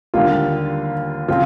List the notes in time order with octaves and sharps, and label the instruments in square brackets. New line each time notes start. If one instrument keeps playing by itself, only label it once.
[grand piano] D#2 D3 G3 A#3 [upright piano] F4
[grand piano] C#3 F3 C4 [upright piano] F4